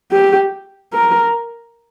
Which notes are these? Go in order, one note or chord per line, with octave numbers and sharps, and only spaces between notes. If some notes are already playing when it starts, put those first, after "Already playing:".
G4
A#4